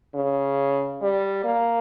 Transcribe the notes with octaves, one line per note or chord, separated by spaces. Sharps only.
C#3
G3
A#3